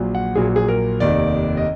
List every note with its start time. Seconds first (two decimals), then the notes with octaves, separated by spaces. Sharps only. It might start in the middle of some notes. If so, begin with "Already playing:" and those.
Already playing: A#1 A#2 F#3
0.15 F#5
0.35 A#1 A#2 F#3 G#4
0.56 G#4
0.68 A#4
1.00 F1 D#2 D#3 D5
1.57 D#5